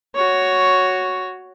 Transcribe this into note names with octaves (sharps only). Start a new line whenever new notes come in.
F#4 C#5